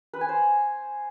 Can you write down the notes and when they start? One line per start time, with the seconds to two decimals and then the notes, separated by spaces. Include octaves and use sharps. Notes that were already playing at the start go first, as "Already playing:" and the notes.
0.13 B4
0.21 G#5
0.29 C5